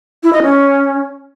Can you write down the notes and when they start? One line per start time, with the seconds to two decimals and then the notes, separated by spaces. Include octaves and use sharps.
0.23 E4
0.33 D#5
0.43 C#4